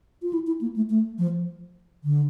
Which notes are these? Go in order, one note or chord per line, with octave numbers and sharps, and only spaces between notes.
F4
E4
E4
A#3
A3
A3
F3
D3